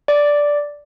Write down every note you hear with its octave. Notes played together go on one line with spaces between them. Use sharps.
D5